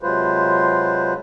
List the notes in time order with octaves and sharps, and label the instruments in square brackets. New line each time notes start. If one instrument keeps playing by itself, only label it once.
[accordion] C3 F#3 G#3 F4 B4 C5